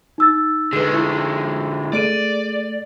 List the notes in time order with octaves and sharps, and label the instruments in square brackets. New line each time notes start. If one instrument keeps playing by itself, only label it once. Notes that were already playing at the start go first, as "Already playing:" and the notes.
[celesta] D#4 E6 A6
[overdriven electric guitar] D3 G#3 [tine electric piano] G#4 B4
[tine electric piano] E4
[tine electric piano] A3 [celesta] G#4 D7 D#7 [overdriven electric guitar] D5